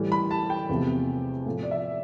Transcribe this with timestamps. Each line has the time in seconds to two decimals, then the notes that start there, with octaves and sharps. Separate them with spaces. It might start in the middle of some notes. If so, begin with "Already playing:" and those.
Already playing: A2 E3 G3
0.12 B5
0.31 A5
0.50 G5
0.69 E2 C3 F3 A3
1.46 A2 F3 A3
1.63 D5
1.71 E5